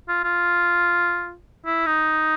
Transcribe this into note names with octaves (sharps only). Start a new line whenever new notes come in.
F4
F4
E4
D#4